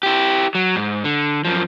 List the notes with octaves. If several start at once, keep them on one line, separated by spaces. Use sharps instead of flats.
E4 G4
F#3
G#2
D3
F#2 F3